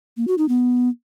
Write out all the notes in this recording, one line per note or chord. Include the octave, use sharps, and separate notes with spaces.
A#3
F#4
D#4
B3